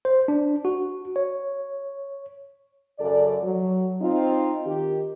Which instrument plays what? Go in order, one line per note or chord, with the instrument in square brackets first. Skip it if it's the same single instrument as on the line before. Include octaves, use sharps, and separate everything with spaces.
[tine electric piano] C5
D4
F#4
C#5
[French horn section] F#2 C#3 A4 D5
F#3
C4 D#4 F4
D#3 G4